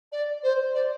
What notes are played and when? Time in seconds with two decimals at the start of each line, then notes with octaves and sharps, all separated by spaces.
0.12 D5
0.43 C5
0.74 D5